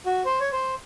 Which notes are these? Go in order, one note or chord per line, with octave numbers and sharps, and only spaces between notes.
F#4
C5
C#5
C5